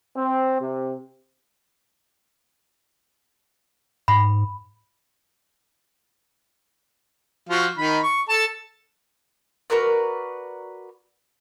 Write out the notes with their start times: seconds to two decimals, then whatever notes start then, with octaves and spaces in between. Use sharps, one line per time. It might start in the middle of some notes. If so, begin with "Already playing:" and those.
0.17 C4
0.62 C3
4.08 G#2 B5
7.49 F3 F#4 F5
7.78 D#3 D#4 B5
8.03 C#6
8.29 A4 A5
9.70 F#4 A#4 B4 D5